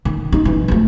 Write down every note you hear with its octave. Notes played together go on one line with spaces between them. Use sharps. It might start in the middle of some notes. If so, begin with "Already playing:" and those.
D#3
D#4
E3
F3 A3